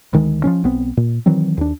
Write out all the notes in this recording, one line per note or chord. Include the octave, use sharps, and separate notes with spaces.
D2 D#3 G#3
F3 F#3 C#4
B1 B3 C4
A#2
D#3 E3 F#3 C4
D#2 D4